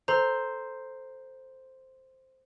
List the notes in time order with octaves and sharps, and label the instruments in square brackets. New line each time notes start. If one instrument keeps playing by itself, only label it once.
[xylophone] A4 A#5 [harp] C5